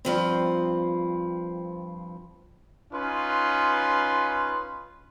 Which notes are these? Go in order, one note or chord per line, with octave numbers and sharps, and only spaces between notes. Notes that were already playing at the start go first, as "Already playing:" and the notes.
G2 F3 C4
C#4 D#4 F4 B4 C6